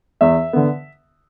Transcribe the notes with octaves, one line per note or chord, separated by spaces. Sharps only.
E2 E5
D3 B3